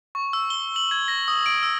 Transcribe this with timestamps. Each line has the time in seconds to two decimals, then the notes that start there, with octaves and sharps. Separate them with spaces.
0.15 C#6
0.33 E6
0.50 G7
0.76 F#7
0.91 G#6
1.08 A#6
1.28 D#6
1.46 D7
1.63 E6